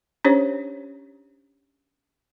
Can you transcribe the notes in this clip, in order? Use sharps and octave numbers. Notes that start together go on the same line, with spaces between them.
C#4 D4 G4 C5 C#5